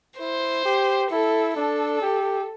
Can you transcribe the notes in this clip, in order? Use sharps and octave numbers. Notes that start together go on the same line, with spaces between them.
E4 C5
G4
E4 A4
D4 A4
G4